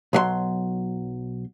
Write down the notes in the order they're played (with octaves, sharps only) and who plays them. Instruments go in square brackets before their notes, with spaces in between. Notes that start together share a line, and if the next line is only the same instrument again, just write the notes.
[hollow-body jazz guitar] B1 F#3 E5 C6